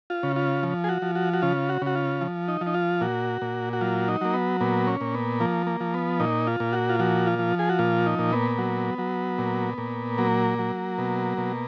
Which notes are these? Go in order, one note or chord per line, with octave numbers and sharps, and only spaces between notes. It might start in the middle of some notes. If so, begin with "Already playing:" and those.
F4
C#3
F4
F3
G#4
F#4
F3
F#4
F#4
C#3 F4
F#4
C#3 F#4
F4
F3
D#4
F3
D#4
F4
A#2 F#4
A#2
F#4
F#3 F4
D#4
F#3 A#3
B3
A#2 B3
C#4
A#2
B3
F3 A#3
A#3
F3
B3
A#2 D#4
F4
A#2
F#4
F4
F3 F#4
F4
F3
G#4
F#4
A#2 F4
D#4
A#2
B3
F#3
F#3
A#2
A#2
F#3 A#3
F#3
B2
B2